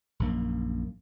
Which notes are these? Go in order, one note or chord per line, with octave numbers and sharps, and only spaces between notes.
A#1 F#2 A#3